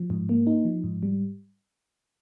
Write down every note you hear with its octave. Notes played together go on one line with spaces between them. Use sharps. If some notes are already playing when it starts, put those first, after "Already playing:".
Already playing: F3
G#2
A#3
D#4
F3
G#2
G3